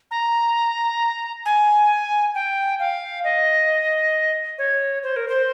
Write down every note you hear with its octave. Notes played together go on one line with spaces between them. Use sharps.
A#5
G#5
G5
F5
D#5
C#5
C5
A#4
C5